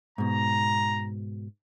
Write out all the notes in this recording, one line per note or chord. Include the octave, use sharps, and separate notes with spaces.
G#2 B2 A#5